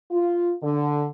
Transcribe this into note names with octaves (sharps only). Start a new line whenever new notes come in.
F4
D3